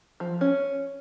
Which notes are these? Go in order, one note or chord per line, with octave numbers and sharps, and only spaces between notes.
F3
C#4